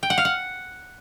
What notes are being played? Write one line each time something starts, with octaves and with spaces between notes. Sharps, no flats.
G5
F#5
F5
F#5